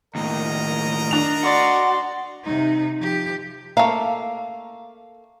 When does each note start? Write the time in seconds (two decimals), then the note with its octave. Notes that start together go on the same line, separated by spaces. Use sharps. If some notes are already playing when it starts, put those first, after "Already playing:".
0.15 D#2 A2 A#4 D#5
1.11 D4 F7
1.43 F#4 D5 C6
2.44 C3 D#4
2.99 F3 G4
3.77 A3 A#3 F5